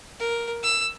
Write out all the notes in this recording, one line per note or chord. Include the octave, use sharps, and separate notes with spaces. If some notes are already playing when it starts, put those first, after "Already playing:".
A#4
E6